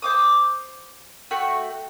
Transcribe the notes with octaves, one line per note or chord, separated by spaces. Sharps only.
C5 D6 D#6
A3 F#4 G5